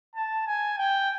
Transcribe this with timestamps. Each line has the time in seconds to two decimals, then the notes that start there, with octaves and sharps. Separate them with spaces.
0.16 A5
0.47 G#5
0.77 G5